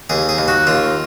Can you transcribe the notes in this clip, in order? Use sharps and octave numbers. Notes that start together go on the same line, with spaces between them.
D#2 G#4
G#4
D#2
F#4
D#2 F4